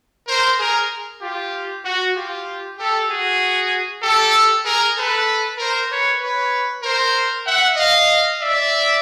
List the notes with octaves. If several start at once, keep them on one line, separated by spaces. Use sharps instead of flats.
A#4 C5
G#4 A#4
F4 G4
F#4
F4 G4
G4 A4
F#4 G#4
G4 A4
G#4 A#4
A4 B4
A#4 C5
B4 C#5
B4 C#5
A#4 C5
E5 F#5
D#5 F5
D5 E5